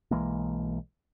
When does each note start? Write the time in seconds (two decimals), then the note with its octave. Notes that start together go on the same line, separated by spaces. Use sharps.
0.11 B1 E3 G#3 A#3